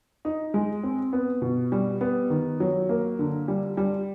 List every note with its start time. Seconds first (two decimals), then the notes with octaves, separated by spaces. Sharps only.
0.25 D#4
0.54 G#3
0.83 C4
1.13 B3
1.42 B2
1.72 G3
2.01 B3
2.30 D#3
2.60 F#3
2.89 A#3
3.19 D3
3.48 G3
3.77 G3